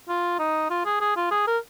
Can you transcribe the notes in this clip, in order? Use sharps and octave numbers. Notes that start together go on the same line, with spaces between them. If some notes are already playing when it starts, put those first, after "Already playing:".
F4
D#4
F4
G#4
G#4
F4
G#4
A#4